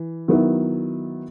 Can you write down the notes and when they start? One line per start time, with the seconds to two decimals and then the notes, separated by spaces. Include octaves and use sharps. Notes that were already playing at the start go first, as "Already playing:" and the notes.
Already playing: E3
0.28 D#3 F#3 B3 E4